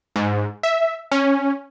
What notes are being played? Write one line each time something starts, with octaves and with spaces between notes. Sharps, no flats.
G#2
E5
C#4